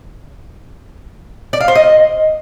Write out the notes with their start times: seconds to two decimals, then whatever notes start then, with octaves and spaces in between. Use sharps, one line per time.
1.53 D5
1.61 F5
1.68 C5
1.75 D#5